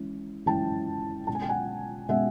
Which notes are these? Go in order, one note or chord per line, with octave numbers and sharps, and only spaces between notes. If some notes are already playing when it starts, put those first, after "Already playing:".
Already playing: E3 G#3 C#4 E4
E3 G#3 C#4 E4 G5 A5
B2 G#3 C#4 A5
G#5
G5
F#5 G#5
B2 G#3 C#4 E5 F#5